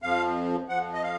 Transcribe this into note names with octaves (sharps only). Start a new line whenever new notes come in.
F2 F3 F5
F2 F3 F#5
D#5
F5